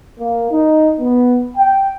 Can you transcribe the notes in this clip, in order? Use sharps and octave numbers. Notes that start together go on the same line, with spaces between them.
A#3
D#4
B3
G5